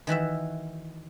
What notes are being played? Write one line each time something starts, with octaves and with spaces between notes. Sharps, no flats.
D#3 E3 F#4 E5